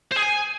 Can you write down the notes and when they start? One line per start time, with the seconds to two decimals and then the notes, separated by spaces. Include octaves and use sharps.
0.12 C5
0.17 G#4
0.22 G#5